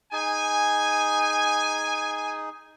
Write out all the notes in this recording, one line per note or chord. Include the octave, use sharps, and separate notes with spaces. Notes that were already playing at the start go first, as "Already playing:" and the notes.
D#4 G#4 G#5